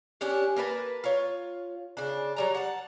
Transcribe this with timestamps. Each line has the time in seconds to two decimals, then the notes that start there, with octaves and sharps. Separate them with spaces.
0.21 C#4 D4 G4
0.56 A#3 A#4 B4 A5
1.04 F4 C#5
1.97 C#3 D4
2.37 F#3 G3 A#5
2.55 F#5 A5